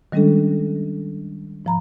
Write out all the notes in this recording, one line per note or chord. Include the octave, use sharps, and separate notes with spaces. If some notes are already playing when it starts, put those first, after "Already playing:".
D#3 G3 G#3 C#4 D4 A4
G#2 F3 A#5 B5